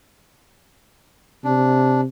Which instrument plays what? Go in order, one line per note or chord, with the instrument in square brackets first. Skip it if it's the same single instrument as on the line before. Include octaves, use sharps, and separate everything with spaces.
[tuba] C3 [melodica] D4